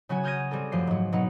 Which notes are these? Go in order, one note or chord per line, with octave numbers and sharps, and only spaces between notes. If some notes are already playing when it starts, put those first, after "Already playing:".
C#3 F#3 C#4 F#4 G#5 G#6
D#6 F6 G6 G#6 A#6 D#7
G3 C4 G#4 A4
F#2 F3 A3 G4 C7
G#2 F#3
B2 F#3 D#4